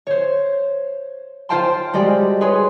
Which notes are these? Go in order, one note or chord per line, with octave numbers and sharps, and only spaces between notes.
C5 C#5
F4 C5 F5 G5 A5 C6
G3 G#3 F#4 G4 D5
G#4 B4 C#5 C6